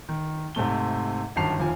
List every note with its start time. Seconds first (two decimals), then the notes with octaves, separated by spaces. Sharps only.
0.09 D#3
0.55 G#2 C3 A3 G7
1.36 G1 F#2 D#3 A5 C7 F7
1.59 F1 D#2 F3 G#5